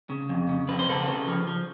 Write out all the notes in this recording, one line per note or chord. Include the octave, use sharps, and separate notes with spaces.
C#3
F2
C#3
F2 B4
C5
C#3 A4 B4
C#3
F3
F3